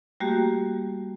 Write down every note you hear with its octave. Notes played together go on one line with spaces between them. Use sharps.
G3 A3 A#3 F#4 G4